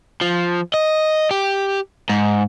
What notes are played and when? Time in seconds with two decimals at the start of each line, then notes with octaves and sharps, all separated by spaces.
0.21 F3
0.74 D#5
1.31 G4
2.09 G#2